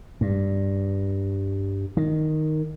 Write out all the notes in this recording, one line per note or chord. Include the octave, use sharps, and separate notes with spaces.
G2
D#3